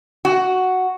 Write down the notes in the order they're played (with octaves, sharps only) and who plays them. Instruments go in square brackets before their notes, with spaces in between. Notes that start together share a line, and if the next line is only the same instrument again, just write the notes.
[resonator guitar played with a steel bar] F#4